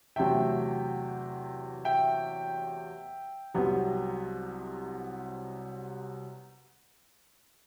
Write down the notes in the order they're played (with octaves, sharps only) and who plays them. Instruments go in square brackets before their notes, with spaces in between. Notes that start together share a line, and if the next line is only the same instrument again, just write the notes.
[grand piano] E2 C3 F#3 A3 E5 G5
E5 G5
C2 C3 F#3 B3